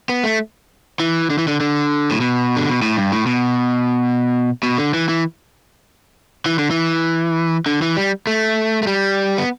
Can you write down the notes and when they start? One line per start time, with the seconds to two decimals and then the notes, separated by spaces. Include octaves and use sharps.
0.09 B3
0.24 A3
1.00 E3
1.30 D3
1.38 E3
1.48 D3
1.60 D3
2.11 A2
2.21 B2
2.57 D3
2.69 B2
2.82 A2
2.97 G2
3.12 A2
3.26 B2
4.63 B2
4.78 D3
4.94 E3
5.09 E3
6.46 E3
6.59 D3
6.71 E3
7.66 D3
7.82 E3
7.97 G3
8.27 A3
8.83 A3
8.87 G3
9.38 B3